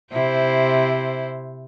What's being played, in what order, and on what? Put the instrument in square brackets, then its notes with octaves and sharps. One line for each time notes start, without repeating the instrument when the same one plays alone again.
[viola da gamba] C3 E4 C5